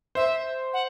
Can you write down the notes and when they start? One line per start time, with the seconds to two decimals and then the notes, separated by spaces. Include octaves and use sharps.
0.15 C5 E5
0.73 F#5